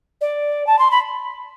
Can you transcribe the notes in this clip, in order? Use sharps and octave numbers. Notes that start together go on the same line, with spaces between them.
D5
A5
C6
B5